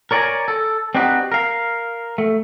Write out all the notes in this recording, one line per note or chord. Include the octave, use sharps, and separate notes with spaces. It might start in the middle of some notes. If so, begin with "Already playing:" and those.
A#4 C#5 D5 E5 G#5 A#5
A4
C4 D4 D#4 F#4 G4 B4
A#4 F5
A3